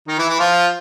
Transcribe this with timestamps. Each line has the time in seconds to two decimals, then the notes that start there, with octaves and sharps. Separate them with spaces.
0.08 D#3 D#4
0.18 E3 E4
0.28 E3 E4
0.39 F3 F4